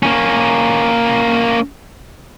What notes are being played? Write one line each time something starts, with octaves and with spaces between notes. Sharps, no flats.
A#3 C#4